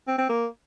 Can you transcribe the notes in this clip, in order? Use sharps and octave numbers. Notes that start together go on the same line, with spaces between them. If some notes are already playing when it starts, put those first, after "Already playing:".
C4
C4
A#3